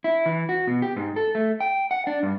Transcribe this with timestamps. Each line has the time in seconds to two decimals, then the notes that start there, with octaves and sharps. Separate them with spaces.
0.04 E4
0.26 E3
0.49 F#4
0.67 B2
0.82 G4
0.96 G#2
1.16 A4
1.35 A3
1.60 G5
1.91 F#5
2.07 D4
2.23 G2